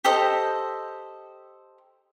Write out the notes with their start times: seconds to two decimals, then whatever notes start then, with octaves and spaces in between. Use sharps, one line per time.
0.04 G4 A4 C5 D#5